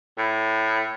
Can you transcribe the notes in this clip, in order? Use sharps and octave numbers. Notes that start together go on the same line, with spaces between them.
A2